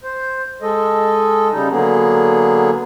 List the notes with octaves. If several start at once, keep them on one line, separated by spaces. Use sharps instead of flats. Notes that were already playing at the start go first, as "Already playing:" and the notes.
C5
G#3 A4 D#5
C#3 G3 D#4
D3 F#3 A#3 B3 G#4